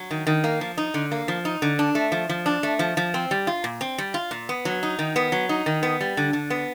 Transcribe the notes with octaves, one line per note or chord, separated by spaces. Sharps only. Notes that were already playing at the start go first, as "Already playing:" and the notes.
Already playing: F#3
D#3
D#3
A#3
F3
D#4
D3
A#3
F3
D#4
D3
D4
A3
F3
F3
D4
A3
F3
F3
C4
G3
F4
A#2
C4
G3
F4
A#2
B3
F#3
D#4
D#3
B3
F#3
D#4
D#3
B3
G3
D3
D3
B3